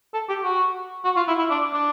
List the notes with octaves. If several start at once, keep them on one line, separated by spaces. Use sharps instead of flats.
A4
G4
F#4
F#4
F4
E4
E4
D4
D4